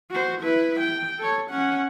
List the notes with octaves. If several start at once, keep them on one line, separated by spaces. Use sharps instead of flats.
F#4 C5
E4 B4
G5
A4 C#5
C#4 F#5